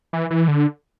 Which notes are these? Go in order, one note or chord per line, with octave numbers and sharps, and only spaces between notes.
E3
E3
D3